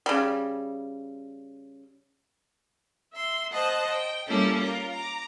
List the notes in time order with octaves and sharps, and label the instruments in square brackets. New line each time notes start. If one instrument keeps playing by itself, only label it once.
[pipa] C#3 G3
[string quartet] E5 C6
C5 D#5 F#5 A5
G5
G3 A#3 C#4 E4 A4
F4 A#4
A#5 D6